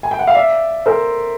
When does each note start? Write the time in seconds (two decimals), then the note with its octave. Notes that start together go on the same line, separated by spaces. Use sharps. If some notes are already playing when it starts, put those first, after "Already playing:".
0.03 G#5
0.11 G5
0.19 F#5
0.27 F5
0.35 D5 E5
0.86 A#4 C5